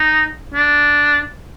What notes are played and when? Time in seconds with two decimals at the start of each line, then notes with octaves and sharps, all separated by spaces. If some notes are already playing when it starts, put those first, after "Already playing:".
Already playing: D#4
0.54 D4